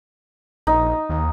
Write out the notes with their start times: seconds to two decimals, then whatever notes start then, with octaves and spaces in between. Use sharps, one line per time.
0.67 A#1 D#4
1.09 D#2